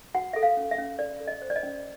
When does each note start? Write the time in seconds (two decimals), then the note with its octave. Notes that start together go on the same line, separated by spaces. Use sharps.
0.15 F#4 F#5
0.33 A4 E5
0.43 F5
0.57 C#4
0.71 E5
0.78 C#4
0.99 A4 D5
1.20 A4
1.27 D#5
1.42 C5
1.50 D5
1.56 D#5
1.63 C#4